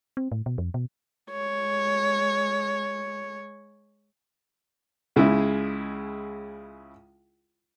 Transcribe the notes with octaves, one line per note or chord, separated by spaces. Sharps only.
C4
A2
B2
F2
B2
G#3 C#5
C#2 C#3 G#3 E4